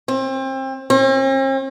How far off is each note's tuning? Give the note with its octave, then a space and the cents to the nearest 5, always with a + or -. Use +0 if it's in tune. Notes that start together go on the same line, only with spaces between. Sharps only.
C4 +30
C4 +45